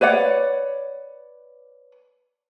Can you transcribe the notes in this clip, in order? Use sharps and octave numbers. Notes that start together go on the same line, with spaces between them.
B4 C#5 D5 F#5